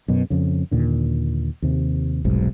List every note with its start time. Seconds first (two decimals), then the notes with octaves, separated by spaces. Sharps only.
0.08 F#2 B2
0.30 F2 C#3
0.71 D#2 A#2 D3
1.62 D#2 C3
2.25 F1 B1 G#2